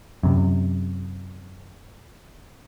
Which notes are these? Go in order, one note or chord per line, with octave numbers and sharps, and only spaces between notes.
F#2 C3